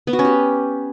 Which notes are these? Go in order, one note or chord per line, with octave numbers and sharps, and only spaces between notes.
B3
F#4
C#4
G4